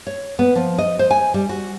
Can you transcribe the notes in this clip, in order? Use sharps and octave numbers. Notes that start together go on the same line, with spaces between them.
C#5
B3
F3
D#5
C5
G#5
G3
F#4